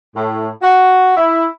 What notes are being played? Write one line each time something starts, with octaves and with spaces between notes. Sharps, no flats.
A2
F#4
E4